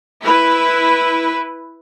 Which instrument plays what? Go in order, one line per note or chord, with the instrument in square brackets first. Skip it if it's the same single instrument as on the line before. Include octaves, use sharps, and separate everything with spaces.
[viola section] E4 B4